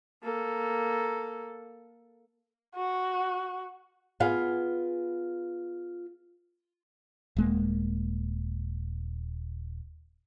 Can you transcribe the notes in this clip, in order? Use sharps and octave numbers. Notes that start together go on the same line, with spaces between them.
A#3 A4
F#4
B3 F4 G#4 F5
D#1 G#3 A#3